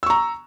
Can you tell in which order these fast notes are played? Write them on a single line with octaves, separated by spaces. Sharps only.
E6 C#6 A#5